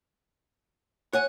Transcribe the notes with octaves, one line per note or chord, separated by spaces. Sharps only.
C#5 F#5 G#5 F#6